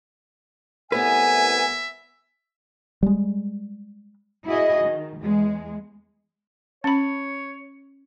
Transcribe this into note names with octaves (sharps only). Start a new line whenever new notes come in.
C2 A2 B3 B4 E5 G#5
G3 G#3
E4 F#4 G#4 D#5
D#3
E2 G#3
C#4 C#5 B5